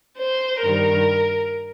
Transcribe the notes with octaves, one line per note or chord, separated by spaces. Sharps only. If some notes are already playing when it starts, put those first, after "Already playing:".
C5
G2 D#3 G3 A#4